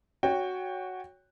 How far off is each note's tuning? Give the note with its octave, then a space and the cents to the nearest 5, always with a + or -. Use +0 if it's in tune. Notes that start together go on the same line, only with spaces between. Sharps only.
F#4 +0 C#5 +15 G5 +20